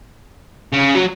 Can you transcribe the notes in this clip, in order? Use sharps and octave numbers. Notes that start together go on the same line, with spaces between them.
C#3
F#3